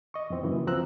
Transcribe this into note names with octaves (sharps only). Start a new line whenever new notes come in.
D#5 C#6
F2 E3 C4
F#2 C#3 E3 A#3
D2 F3 C4 A#5 E6 F#6